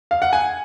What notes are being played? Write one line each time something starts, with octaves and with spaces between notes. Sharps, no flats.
F5
F#5
G#5